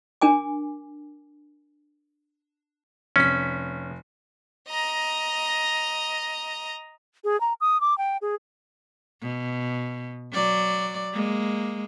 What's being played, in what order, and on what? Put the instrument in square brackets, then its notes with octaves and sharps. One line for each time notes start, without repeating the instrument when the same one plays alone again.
[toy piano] D4 A#4 G#5 D6
[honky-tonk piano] F1 B6 [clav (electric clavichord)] C#4
[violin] D#5 A#5
[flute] G#4
A#5
D#6
D6
G5
G#4
[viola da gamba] B2
F#3 D5
G#3 A#3